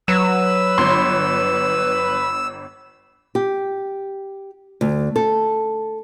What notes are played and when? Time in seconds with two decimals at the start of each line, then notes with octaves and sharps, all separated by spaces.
0.08 F#3 B4 E6 E7
0.78 G1 C6
3.35 G4
4.81 D2
5.16 A4